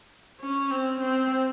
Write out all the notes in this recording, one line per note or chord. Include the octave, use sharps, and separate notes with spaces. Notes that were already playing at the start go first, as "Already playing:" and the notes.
C#4
C4
C4